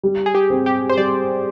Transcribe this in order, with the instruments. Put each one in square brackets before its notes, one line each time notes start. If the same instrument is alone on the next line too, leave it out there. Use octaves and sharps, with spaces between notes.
[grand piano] G3
[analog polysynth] G#4
G4
[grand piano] C4
[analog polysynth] G4
C5
[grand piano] G3 [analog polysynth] D5